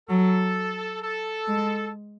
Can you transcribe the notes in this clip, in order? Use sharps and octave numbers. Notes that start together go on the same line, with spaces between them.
F#3 A4
A4
G#3